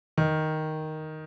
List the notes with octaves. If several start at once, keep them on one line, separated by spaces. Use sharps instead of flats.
D#3